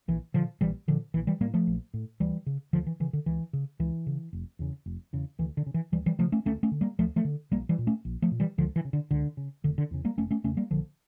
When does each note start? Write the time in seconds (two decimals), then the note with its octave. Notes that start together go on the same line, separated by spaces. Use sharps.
0.08 A#1 E3
0.34 A#2 D3 F3
0.61 A#1 E3 G3
0.88 A#2 D3 F3
1.14 A#1 E3
1.27 E3 G3
1.41 A2 G3 A#3
1.54 F3 A3
1.67 A#1
1.94 A2
2.20 D2 E3 G3
2.46 C#3
2.73 D2 D3 F3
2.87 E3
3.00 C#3 E3
3.13 D3
3.26 C#2 E3
3.53 C#3
3.79 C#2 E3
4.07 C#3
4.33 F1
4.59 E2 C#3
4.86 F1
5.13 E2 C#3
5.39 D2 E3
5.57 D3
5.66 C#3
5.74 E3
5.92 D2 E3 G3
6.06 E3 G3
6.19 C#3 F3 A3
6.32 A3 C#4
6.45 D2 A3 C#4
6.63 A3 C#4
6.72 D3
6.81 G3 A#3
6.99 D2 F3 A3
7.16 F3 A3
7.25 D3
7.51 A#1 G3 A#3
7.69 E3 G3
7.78 A#2
7.87 A3 C#4
8.05 A#1
8.22 F3 A3
8.31 A#2
8.40 E3 G3
8.58 C#2 D3 F3
8.76 E3
8.85 C#3
8.93 D3
9.11 C#2 D3
9.37 C#3
9.64 F1 D3
9.78 D3
9.91 E2 C#3
10.05 G3 A#3
10.17 F1 A3 C#4
10.31 A3 C#4
10.44 E2 C#3 A3 C#4
10.57 G3 A#3
10.71 A#1 D3 F3